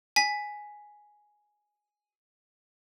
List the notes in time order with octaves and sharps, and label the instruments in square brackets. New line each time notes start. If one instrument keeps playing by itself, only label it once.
[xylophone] G#5 B6